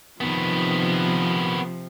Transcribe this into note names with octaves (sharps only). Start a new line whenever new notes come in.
C3 D#3 F3 B3